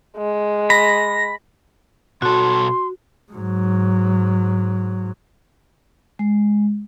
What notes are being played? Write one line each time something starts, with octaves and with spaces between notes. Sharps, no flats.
G#3
B5 A#6
B2 F#4 A4 C6
G#2 F#3
G#3